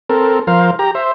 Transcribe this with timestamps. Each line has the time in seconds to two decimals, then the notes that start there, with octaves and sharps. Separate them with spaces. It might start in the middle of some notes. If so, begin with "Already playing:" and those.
0.09 C4 A4 A#4
0.47 F3 A#4 C5 F5
0.79 G4 A#5
0.95 C5 E5